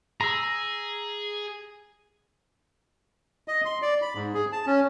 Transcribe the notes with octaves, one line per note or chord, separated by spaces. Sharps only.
G#4 A#5 E6
D#5
C6
D5
B5
G#2
G#4
A5
C#4